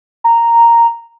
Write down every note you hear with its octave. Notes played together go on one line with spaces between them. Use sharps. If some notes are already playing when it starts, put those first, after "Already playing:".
A#5